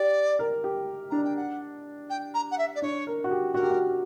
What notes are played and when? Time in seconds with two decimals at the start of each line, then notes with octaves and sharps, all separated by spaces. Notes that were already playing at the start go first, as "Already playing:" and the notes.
Already playing: G4 D5
0.39 A#4
0.64 G4
1.10 D4 A#5
1.24 G5
1.36 F#5
2.10 G5
2.34 A#5
2.51 F#5
2.58 E5
2.75 D5
2.82 D4 C#5
3.07 A#4
3.24 F#4
3.31 G4
3.54 F#4 A#4
3.63 G4
3.71 F#4